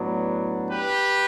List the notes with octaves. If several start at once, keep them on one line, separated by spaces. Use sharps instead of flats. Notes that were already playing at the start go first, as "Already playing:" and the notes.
Already playing: A2 F#3 B3 D4
G4 B4